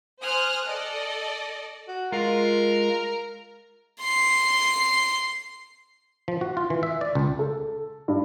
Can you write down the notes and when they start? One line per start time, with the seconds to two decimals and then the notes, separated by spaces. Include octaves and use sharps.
0.21 C5 G#5 D#6 F6 F#6
0.66 A4 D5 D#5
1.88 F#4
2.12 G#3 F4 A#4
4.00 C6 C7
6.28 F3
6.41 F#4
6.57 F4
6.70 E3
6.83 E5
7.01 D5
7.15 C#2
7.39 A4
8.08 G2